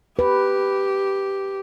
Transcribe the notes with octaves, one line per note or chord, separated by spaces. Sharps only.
G4 B4